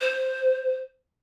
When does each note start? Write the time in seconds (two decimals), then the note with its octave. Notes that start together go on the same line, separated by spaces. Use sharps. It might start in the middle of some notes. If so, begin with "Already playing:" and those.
0.01 C5